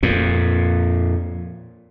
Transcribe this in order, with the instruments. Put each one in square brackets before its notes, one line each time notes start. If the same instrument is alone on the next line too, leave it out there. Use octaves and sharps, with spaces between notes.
[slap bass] F2 A#2